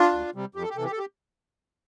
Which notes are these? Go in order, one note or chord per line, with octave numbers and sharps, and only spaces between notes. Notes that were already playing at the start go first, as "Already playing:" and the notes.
Already playing: D4 F4
D2
C3 G3
F2 G4
A4
G4
C3 E3 A4
G4
A4
G4